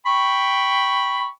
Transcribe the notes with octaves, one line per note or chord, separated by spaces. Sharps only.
G5 B5 C#6